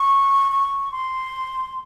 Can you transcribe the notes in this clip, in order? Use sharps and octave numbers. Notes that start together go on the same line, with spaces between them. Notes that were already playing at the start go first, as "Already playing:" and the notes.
Already playing: C#6
C#6
C6